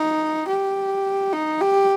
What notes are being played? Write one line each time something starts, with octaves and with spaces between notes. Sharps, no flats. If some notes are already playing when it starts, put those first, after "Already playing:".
Already playing: D#4
G4
D#4
G4